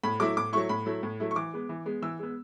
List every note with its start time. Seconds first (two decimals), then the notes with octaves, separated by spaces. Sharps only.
0.04 A2 B5
0.20 F#3 A3 E4 D6
0.37 A2 D6
0.53 F#3 A3 E4 C#6
0.69 A2 B5
0.86 F#3 A3 E4
1.03 A2
1.20 F#3 A3 E4
1.31 C#6
1.36 E3 D6
1.53 G#3 B3
1.69 E3
1.86 G#3 B3
2.02 E3 E6
2.19 G#3 B3